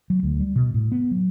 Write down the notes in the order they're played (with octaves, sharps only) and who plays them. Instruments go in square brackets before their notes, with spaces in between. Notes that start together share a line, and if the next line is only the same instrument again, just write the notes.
[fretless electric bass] F#3
D2
G3
B2
A2
B3
F#3